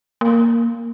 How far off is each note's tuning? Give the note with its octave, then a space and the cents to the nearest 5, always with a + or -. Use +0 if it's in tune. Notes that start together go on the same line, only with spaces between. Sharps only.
A#3 -5